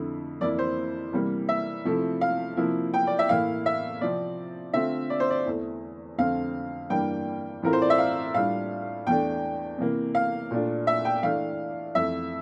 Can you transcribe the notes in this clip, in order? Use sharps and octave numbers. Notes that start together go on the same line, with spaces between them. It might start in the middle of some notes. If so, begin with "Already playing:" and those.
Already playing: F2 D3 A3 E4
F2 E3 A#3 E4 D5
C5
C3 E3 G3 A#3
E5
C3 F3 A3 E4
F5
C3 F3 A#3 E4
G5
D5
E5
A2 E3 A#3 E4 F5
E5
C3 F3 C4 D5
D3 A3 C4 F4 E5
D5
C5
D5
E2 E3 A3
F2 D3 A3 C4 F5
G2 E3 G3 A#3 D4 G5
A2 E3 A3 C4 F4 A#4
C5
D5
E5
F5
A2 G3 D4 F4 F5
E2 E3 A3 D4 G5
C3 E3 A#3
F5
A#2 A3 D4 F4
E5
G5
E3 A3 D4 F5
F2 E3 A3 E5